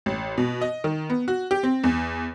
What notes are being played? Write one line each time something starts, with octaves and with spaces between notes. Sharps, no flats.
A1
B2
D#5
D#3
B3
F#4
G4
C4
E2